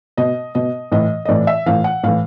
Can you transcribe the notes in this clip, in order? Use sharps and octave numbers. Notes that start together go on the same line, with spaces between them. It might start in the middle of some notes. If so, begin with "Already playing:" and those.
B2 D#5
B2 D#5
A2 E3 D#5
D#5
A2 E3 D5
E5
A2 E3 F5
F#5
A2 E3 F5